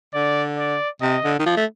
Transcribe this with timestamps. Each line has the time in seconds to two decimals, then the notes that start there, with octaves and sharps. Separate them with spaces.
0.14 D3 D5
0.58 D5
1.01 C3 D#5
1.24 D3
1.39 D#3
1.46 F3
1.57 A3